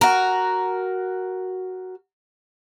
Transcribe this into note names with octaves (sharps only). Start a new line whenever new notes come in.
F#4 A#4